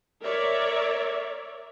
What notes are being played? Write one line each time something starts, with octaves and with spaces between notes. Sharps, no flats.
A#4 C#5 D5 E5